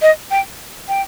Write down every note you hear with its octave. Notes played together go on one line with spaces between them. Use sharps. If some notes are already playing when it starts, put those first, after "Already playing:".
D#5
G5
G5